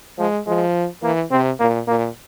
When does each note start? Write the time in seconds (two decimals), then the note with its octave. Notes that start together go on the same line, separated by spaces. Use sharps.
0.18 F3 G#3
0.46 F3 G#3
1.03 E3 A#3
1.31 C3 C4
1.60 A#2 A#3
1.88 A#2 A#3